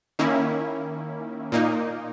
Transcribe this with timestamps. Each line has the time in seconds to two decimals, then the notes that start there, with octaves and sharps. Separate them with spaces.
0.19 D#3 A#3 C#4 E4
1.52 A#2 A#3 D#4